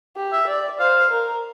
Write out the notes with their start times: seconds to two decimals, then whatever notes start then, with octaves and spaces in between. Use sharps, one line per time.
0.17 G4
0.32 E5
0.48 D5
0.80 C5 F5
1.11 A#4